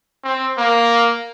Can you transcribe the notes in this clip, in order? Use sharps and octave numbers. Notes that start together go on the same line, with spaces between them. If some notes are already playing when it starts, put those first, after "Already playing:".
C4
A#3